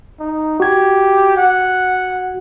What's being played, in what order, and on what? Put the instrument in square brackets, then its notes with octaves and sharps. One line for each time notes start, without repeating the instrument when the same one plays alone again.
[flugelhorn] D#4
[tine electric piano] F#4 G#6 [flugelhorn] G4
[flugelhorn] F#5